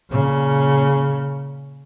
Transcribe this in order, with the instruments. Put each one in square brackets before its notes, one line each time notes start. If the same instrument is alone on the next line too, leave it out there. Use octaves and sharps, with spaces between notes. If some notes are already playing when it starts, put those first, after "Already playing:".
[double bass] A#2 C#3